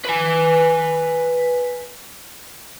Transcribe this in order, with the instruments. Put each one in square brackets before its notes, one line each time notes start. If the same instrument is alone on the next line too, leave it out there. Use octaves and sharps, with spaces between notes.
[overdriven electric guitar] B4 G#5